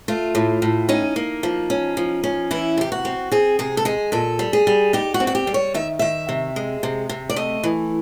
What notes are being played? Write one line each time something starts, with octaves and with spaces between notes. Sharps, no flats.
A3 F4
A2
A2
C#4 D#4
A#3
F3
C#4
F3
C#4
E3 E4
C3 G4
F#4
C4
C4 G#4
C3 G#4
A4
G#3 G#4
A#2 A4
G3
G#4
G3
D#4 G4
F#4
C4
F#4
G4
G3
C#5
D#3 E5
D#3 E5
C3
G#3
C3
C3
D5
A3 D#5
E3